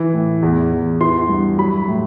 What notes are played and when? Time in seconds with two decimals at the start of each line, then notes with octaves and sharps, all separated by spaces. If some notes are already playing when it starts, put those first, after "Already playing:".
Already playing: E3
0.13 A2
0.42 E2
0.72 E2
1.01 E3 C6
1.29 G2
1.58 F#3 B5
1.88 A2